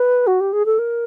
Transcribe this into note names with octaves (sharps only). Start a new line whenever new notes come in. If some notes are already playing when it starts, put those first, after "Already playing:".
Already playing: B4
F#4
G4
G#4
A4
A#4